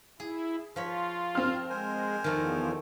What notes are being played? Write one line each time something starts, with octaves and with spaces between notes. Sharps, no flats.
E4 G#4
F3 F4 C#5 B5
C4 F5 F6
G#3 A#4 C5 G#5
E2 D#3 F3 A3 D5